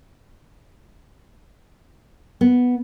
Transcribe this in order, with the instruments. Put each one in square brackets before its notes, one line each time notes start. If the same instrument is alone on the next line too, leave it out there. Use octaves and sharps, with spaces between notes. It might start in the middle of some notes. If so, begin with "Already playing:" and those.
[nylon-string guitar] B3